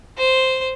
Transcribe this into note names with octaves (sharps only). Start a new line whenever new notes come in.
C5